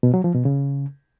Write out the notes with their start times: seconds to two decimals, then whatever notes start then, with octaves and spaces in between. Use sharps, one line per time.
0.03 B2
0.14 F#3
0.24 F3
0.35 B2
0.45 C#3